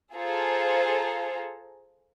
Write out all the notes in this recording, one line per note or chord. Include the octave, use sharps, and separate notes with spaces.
F4 G#4 A4 C5 A#5